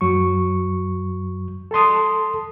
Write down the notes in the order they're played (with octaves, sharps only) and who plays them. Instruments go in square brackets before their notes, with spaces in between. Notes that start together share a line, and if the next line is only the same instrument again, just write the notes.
[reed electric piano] F#2 F#3 C#6
A4 A5 C6 D#6